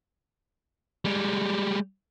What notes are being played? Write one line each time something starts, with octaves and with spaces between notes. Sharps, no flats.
G3 G#3